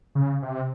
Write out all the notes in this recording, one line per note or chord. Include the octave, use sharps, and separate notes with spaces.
C#3
C3